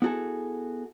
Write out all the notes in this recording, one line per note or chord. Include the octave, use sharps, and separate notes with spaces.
B3 E4 F#4 G#4 A4